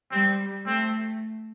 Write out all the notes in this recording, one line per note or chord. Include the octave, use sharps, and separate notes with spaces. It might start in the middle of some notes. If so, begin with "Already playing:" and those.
G3 C4
A3 C4